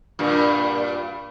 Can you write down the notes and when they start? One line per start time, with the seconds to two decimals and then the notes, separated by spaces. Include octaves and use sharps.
0.19 G2 A#2